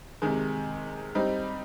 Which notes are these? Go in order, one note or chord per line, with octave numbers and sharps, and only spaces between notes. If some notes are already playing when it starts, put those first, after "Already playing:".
C3 D#3 G#3
G3 C4 D#4